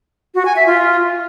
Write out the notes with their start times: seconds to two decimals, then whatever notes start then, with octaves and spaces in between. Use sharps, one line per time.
0.35 F#4
0.45 G#5
0.56 E5
0.67 F4